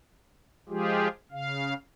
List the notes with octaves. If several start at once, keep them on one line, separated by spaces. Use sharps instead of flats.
F3 G#3 F4 G4 G#4
C#3 F5